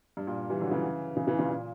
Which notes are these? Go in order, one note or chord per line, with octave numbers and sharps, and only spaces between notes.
G2
A#2
E3 G3
D3 F#3
C#3 E3
C#3 E3
C#3 E3
A#2 C#3
A#2